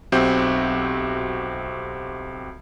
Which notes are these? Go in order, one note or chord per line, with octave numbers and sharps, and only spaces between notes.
B1 C4 F#4 G4 E5 G6